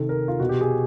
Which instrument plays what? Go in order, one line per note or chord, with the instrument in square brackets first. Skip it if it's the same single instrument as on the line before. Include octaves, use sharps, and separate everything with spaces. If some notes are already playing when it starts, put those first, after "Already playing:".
Already playing: [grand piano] C3 D#3 A4
A#4
F4
B2 F#4
G4
G#4